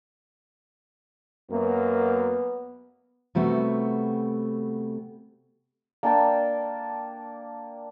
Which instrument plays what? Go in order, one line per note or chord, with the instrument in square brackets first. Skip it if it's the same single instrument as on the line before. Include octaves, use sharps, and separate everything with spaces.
[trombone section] F#2 A#3 [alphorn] B3
[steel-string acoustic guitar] C3 G3 A3 B3 F#4
[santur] A#3 D4 G5 A5